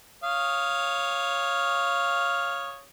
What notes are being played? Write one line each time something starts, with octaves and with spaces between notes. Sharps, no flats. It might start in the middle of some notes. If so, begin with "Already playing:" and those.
C#5 F5 D#6